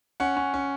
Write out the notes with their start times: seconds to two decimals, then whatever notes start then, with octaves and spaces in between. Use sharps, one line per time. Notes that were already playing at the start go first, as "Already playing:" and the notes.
0.20 C#4 F#5
0.37 C#4
0.54 C#4